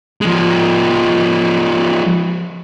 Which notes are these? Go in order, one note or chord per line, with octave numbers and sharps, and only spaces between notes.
F3 G#3